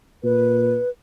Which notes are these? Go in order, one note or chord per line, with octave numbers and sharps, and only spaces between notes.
A#2 B4